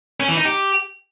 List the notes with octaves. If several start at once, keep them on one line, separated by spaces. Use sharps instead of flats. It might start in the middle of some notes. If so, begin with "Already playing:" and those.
C#4
E3
D#4
G4